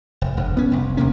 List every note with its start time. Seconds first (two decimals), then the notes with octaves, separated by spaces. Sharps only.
0.21 F1
0.37 E1 G2
0.57 B3 C#4
0.72 F1 C2
0.97 D#1 C3 A#3 C#4